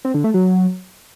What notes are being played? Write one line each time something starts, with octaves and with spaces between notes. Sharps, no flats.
C4
D3
A3
F#3